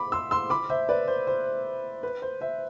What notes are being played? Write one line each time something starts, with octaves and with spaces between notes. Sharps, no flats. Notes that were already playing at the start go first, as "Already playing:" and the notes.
Already playing: B5 D6
C6 E6
C6 E6
B5 D6
C5 E5
B4 D5
C5
C5
B4
C5
C5 E5